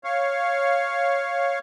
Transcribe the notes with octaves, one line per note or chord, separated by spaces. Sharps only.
C#5 F5